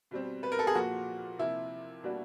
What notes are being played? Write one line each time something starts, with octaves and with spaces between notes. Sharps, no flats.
B2 G3 C4
B4
A#4
A4
G#4
A#2 F3 A#3 F#4
C3 F3 A#3 E4
B2 G3 A#3 D4 F#4